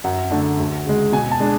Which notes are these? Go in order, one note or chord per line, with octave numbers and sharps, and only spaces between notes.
F#2 F#5
D3 A3 D4
D2
C#3 G#3
B2 G#5
A5
G#3 D4